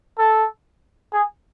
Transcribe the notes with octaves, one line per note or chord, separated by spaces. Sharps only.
A4
G#4